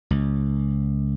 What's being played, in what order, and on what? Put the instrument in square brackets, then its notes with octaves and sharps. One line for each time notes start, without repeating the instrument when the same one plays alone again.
[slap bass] C#2